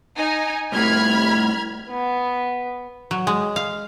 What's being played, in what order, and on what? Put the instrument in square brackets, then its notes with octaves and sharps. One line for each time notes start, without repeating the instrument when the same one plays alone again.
[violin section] D#4 G#5
[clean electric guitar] C2 A2 [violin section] B5 F6 G#6
[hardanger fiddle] B3
[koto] F#3
G#3
F5